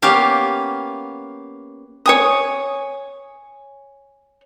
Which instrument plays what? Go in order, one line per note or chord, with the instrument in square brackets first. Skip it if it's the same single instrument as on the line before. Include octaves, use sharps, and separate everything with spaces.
[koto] A#3 B3 C#4 G4 F5
[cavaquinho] C#5 G#5 D#6